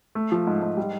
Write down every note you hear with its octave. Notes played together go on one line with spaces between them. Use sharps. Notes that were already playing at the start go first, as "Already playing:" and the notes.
A3
F3
G#2
G#2
G3